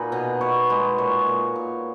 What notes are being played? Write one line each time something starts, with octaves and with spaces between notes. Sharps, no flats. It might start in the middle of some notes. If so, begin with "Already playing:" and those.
Already playing: A#2 D#4 F#4 G#4 B4
B2 D#5
B2 C#5
G#3 B4
A#2 C#5
A#2
A#2